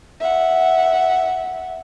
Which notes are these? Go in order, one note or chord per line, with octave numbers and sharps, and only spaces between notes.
E5 F#5